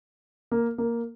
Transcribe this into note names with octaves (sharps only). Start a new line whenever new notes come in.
A#3
A#3